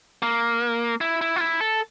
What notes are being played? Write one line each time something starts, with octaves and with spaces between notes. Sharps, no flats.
A#3
E4
E4
F4
E4
A4